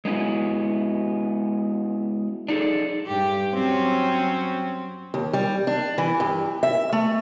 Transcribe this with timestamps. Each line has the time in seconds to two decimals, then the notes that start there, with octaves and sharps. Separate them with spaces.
0.05 G#3 B3 C#4 E4 F#4
2.48 D4 D#4 G#4 A4
3.07 G2 G4
3.54 F#3 C4 C#4
5.14 D#2
5.33 G3
5.67 D4
5.98 E3
6.20 G2
6.63 E5
6.93 A3